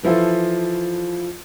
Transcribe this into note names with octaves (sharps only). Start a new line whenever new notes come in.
E3 F3 E4 F4 A4